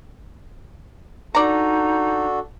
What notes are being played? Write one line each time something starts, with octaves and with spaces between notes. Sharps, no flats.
D4 D#4 F#4 A4 D5 A#5